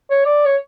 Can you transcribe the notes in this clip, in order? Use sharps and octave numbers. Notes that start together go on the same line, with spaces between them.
C#5
D5
C#5